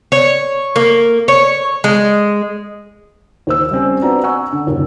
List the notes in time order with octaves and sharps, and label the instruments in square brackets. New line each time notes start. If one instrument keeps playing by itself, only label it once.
[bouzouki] C#5
A#3
C#5
G#3
[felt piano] D#2 C5 E6
G3 C4 C#4
B3 C4 D4 F#4 A#5
F#5 G#5 A#5 C#6 E6
D3
F#1 D#2